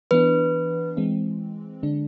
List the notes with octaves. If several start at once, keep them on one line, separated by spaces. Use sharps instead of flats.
E3 B3 D4 B4
E3 G#3 C4
D3 G#3 D4